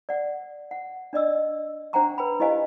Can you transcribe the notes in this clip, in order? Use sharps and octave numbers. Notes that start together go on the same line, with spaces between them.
D5 F#5
F#5
D4 D5 D#5 E6
D4 C5 F#5 G5 A#5 C#6
B4 G5 B5
E4 G4 C5 D#5 F5 G#5